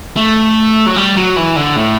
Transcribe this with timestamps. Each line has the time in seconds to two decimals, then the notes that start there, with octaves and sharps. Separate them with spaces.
0.16 A3
0.86 F#3
0.96 G3
1.16 F#3
1.36 E3
1.56 D3
1.76 A2